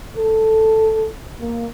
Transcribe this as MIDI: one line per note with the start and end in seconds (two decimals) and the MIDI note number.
0.16 1.08 69
1.41 1.67 58